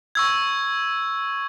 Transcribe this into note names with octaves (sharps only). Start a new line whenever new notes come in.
C#6 E6 G#6